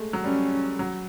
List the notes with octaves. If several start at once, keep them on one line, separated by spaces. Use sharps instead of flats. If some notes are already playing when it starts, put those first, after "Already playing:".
Already playing: G#3 A3
F#3
G3 C#4
F#3